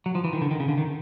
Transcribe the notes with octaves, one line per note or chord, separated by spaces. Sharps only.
F#3
F3
E3
D#3
D3
D#3
C#3
D3
D#3